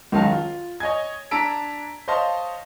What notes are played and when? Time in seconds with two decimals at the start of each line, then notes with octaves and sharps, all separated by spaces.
0.12 C#2 D#3 F#3 F5 A5
0.32 F4
0.80 C#5 D#5 G#5 G#6
1.31 D4 A5 A#5 E6 B6 D7
2.08 C5 C#5 D#5 F5 A5 C6